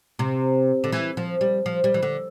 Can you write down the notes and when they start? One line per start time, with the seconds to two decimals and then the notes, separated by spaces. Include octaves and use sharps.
0.19 C3
0.84 D3
0.92 E3
1.17 F3
1.41 G3
1.66 F3
1.84 G3
1.94 E3
2.03 D3